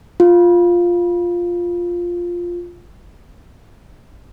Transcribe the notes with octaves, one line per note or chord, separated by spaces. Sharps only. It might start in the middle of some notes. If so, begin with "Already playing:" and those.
F4